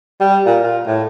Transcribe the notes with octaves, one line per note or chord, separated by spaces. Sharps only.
G3
A#2
F4
A2